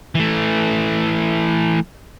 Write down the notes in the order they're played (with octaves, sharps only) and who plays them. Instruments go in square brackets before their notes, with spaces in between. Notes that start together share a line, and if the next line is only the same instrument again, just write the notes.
[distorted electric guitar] E3 A3